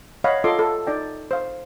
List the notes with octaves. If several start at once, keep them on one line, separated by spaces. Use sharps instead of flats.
C#5 D#5 F5 F#5 B5
F4 A4 D#5 C6 D6
A4
D#4 D5 G5
C5 F5